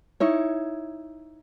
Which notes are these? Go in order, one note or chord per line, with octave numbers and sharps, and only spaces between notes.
D#4 E4 C#5